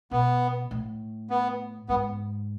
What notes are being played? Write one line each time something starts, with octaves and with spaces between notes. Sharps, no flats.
B2 B3
A2
B3
G#2 B3